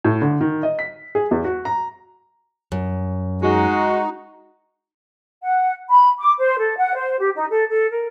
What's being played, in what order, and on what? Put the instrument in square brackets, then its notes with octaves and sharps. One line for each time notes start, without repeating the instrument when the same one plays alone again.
[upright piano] A2
D3
D#3
D#5
B6
G#4
E2
F#4
A#5
[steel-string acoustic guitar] F#2
[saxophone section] G#3 F#4 [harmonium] D#4
[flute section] F#5
B5
D6
C5
A4
F#5
C5
G4
D#4
A4
A4
A#4